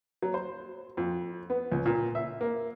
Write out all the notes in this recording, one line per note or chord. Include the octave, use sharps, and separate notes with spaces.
F#3
C5
F2
B3
C#2
A#2
E5
A#3